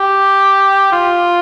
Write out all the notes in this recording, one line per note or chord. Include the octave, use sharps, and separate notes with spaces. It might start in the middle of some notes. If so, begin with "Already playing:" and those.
Already playing: G4
F4